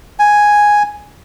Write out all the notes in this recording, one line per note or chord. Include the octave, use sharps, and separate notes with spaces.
G#5